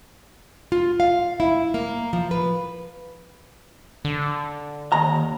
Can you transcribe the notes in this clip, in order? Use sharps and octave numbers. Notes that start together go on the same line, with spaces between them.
F4
F5
E4
A#3
F3
B4
D3
D#2 A#5